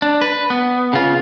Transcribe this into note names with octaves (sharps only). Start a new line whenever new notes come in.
D4
B4
B3
C#3 F4